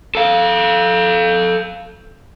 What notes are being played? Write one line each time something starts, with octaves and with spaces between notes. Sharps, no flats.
A4 F5